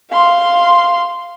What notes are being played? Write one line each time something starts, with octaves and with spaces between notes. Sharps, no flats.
F5 C6